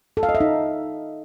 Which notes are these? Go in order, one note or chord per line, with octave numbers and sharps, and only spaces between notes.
A4
F5
D#5
E5
D#4